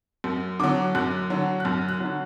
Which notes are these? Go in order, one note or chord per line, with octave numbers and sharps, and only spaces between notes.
F#2
D3 F#3 D6
F#2 F#6
D3 F#3
F#6
F#2 F6
F#6
D3 F#3